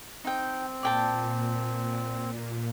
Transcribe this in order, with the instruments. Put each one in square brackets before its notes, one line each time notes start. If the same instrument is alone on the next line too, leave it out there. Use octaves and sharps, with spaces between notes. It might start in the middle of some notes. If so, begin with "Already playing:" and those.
[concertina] C4 [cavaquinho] D#4 G5
[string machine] A#2 [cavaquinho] D5 G5 A5